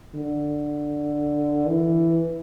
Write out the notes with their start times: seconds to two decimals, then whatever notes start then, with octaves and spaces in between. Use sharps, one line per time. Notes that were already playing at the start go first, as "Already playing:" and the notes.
0.15 D3
1.67 E3